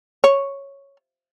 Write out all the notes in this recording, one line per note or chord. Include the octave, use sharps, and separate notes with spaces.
C#5